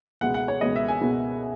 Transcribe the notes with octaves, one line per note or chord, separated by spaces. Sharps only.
C#2 B2 G#3 B3 F#5
F#5
C#5
C#2 B2 G#3 B3 D#5
E5
G#5
C#2 B2 G#3 B3